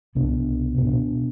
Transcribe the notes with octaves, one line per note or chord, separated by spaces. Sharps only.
C2 B2 B3 D4
B2 B3 D4